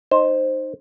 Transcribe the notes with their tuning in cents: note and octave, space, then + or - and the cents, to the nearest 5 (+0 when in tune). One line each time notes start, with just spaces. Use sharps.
D#4 -10 C5 +10